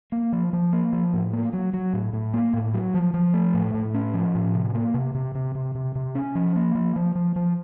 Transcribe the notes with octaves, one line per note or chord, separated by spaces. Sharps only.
A#3
F3
F3
A#3
F3
A2
A#3
F#3
F#3
A2
A2
A#3
A2
F#3
F3
F3
A3
A2
A2
C#4
F3
A2
C3
A#3
C3
C3
C3
C3
C3
C3
C#4
F3
A#3
F3
F3
F3
F3